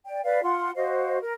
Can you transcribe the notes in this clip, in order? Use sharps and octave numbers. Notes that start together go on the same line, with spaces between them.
D5 G5
B4 D5 F5
F4 F#5 C6
F#4 C5 D#5 F5
A#4